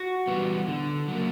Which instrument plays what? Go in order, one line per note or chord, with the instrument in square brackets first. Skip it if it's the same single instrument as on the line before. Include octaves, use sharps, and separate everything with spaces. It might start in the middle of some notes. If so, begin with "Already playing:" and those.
Already playing: [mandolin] F#4
[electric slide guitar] E3 G3 B3
D3
F#3 A#3